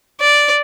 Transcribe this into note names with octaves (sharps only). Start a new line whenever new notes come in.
D5